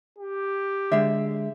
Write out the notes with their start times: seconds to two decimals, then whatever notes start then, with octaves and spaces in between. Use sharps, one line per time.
0.18 G4
0.92 D3 G#3 E5